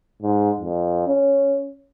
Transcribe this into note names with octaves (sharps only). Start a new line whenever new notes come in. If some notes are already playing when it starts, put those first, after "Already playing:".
G#2
F2
C#4